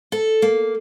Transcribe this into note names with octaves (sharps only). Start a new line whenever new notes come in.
A4
A#3